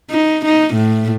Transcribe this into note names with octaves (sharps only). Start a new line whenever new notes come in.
D#4
D#4
A2